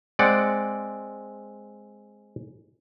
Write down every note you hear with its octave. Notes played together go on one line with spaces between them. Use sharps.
G#3 C4 D5 F#5